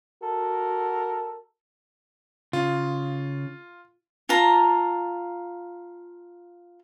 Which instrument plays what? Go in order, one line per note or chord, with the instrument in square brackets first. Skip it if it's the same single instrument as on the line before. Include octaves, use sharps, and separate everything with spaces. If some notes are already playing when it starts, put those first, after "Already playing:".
[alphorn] F#4 [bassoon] A4 [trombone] A#4
[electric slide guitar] C#3 [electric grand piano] F4
[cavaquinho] F4 A5 A#5